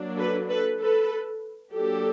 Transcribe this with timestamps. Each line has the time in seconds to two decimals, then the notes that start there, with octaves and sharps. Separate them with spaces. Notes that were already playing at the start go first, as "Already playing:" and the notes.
Already playing: F#3 A#3 D4
0.18 A4 B4
0.49 A4 B4
0.80 A4 B4
1.73 F#3 A#3 D4 G4 A4